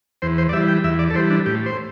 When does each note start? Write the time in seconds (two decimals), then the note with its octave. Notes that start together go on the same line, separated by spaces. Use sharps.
0.22 E2 C5
0.38 C5
0.49 D5
0.53 G3 E5
0.56 E3
0.68 G5
0.84 E2 E5
0.99 D5
1.11 A4
1.14 E3 G3 C5
1.30 D4
1.46 A2 G4
1.66 C5